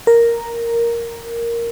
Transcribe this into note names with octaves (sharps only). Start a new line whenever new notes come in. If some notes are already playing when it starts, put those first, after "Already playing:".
A#4